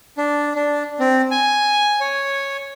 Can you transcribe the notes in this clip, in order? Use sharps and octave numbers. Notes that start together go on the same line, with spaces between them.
D4
D4
C4
G#5
C#5